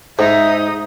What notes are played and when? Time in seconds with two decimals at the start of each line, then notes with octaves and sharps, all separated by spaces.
0.19 G#2 D#4 E5 D#6